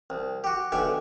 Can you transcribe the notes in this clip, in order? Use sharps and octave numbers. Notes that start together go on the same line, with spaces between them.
C2
F#4 G4
B1 D3 G4 E5 G#5